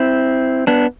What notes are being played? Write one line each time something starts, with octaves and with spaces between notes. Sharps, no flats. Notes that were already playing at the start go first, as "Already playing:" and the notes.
Already playing: C4 E4
B3 D4